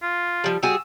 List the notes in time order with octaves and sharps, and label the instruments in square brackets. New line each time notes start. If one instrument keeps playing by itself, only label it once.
[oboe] F4
[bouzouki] F3 G3
[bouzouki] G3 F#4 G#4 [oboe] E6